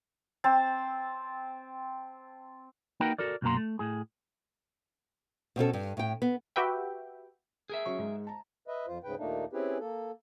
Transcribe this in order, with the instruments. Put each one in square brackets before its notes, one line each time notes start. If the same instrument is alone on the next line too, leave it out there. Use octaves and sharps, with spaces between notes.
[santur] C4 A5
[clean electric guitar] A#3 D#4 F#4 A#4 B4 G5
F#4 A4 A#4 D5
B1 F#2 F#3 A#3 A#5 C6
A3
A2 G#4
[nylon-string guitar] B2 C4 C#4 A4
G2
A2 G5
B3
[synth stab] F#4 G4 B4 E5 G5
[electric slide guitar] G#4 A#4 E5
[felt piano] F#3 C#4 C#6
G#2 G#3
A5 A#5
[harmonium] B4 D#5 E5
F2 F4 C5
D2 G#2 C#3 B4 G5
D#2 A#2 A3 A#3 D4 D#4
C4 C#4 E4 G4 G#4 B4
A#3 A4